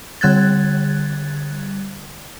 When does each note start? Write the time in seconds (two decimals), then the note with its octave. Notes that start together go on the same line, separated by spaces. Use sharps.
0.21 D3 G3 F#6 G#6 A6